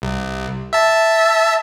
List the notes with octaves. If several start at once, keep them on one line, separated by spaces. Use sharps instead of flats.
C2
E5 A5